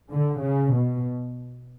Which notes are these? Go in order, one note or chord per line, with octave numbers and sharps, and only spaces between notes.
D3
C#3
B2